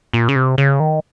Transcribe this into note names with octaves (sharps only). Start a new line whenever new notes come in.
A#2
C#3
C3
C#3
D#3